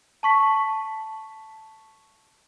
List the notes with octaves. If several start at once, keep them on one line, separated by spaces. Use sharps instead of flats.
A5 C#6 B6